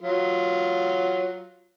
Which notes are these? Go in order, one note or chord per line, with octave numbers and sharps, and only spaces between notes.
F#3 F4